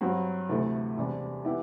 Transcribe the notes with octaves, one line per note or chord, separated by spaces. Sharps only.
G2 F#3 C4 F#4
D2 C3 E3 A3
E2 C3 G3 D4
E3 B3 E4 G4